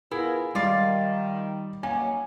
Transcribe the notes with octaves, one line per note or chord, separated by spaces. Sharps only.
B3 E4 F4 G#4 A#4
D#3 G3 F4 D5 F5 D6
F#3 A#3 C#4 D#4 G#5